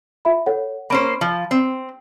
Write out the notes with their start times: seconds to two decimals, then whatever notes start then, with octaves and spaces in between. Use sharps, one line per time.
0.25 F4 E5 B5
0.46 A4 C#5 F#5
0.90 A#3 C#4 C5 B5 D7
1.21 F3
1.51 C4